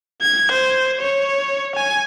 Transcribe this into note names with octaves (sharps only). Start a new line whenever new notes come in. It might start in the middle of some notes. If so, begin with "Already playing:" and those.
G#6
C5
C#5
G#5